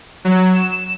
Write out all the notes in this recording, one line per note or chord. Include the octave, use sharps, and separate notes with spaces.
F#3
E7